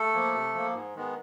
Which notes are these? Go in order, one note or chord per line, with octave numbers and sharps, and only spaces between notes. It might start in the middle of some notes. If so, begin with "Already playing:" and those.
Already playing: A3 A4
F3 A#3
C3
F3 A#3
G#2
D#3 G#3 B3